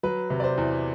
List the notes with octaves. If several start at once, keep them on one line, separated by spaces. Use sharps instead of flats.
F#3 B4
C3
D5
C5
E2